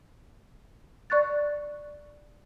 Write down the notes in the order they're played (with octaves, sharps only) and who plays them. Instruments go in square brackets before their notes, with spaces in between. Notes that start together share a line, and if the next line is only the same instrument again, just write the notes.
[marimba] D5 C#6 F#6 A6